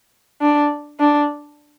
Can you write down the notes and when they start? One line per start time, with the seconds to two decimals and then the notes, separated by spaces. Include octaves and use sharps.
0.41 D4
1.00 D4